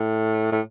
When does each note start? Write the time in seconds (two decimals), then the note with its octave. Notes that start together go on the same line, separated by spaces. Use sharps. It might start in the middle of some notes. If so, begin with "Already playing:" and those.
Already playing: A2
0.52 A2